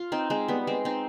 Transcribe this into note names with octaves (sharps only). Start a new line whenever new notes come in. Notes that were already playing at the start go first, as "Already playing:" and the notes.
Already playing: F4
C4 D#4
G#3 C4
G3 B3
G#3 C4
C4 D#4